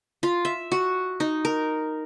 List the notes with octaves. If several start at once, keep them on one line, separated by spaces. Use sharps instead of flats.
F4
E5
F#4
D#4
A#4